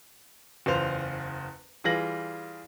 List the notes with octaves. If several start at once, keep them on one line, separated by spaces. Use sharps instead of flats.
F#1 E2 F4 C5 F7
E3 G3 F4 G#4 A#6 F#7